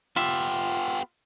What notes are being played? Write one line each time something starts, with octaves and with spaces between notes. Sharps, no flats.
B3 F4 G4 E5